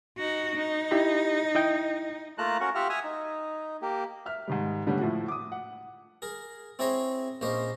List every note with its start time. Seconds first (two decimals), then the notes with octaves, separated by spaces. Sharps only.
0.18 D#4 F#4
0.56 D#4
0.91 E4 G4 B5
1.55 E4 D#5 G5
2.38 A3 A#3 F4 A5 A#5 F#6
2.61 C#4 F#4 A#4 C#6
2.75 F4 G4 E5 F#5 F6
2.89 E5 G#5 D#6 F6
3.04 D#4
3.82 A#3 G4
4.26 E5 F6
4.47 G#2 D#3 G3
4.87 D3 G3 A3 B3 C#4
4.99 A2 F3 E4 F#4
5.28 D6 D#6
5.52 F#5
6.22 G#4 A#4
6.79 C4 E4 G#4 C5 C#5 A#5
7.41 A#1 A#3 C#4 C5 D#5